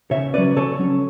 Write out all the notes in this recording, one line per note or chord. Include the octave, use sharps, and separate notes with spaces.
C#3 C#5 E5
F#3 C#4 B4 D5
C#3 A4 C#5
F#3 C#4